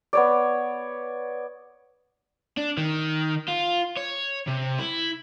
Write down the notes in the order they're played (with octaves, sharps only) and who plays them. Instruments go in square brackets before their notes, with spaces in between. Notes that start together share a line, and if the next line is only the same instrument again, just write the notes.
[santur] B3 C#5 D5
[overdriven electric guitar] D4
D#3
F4
C#5
C3
E4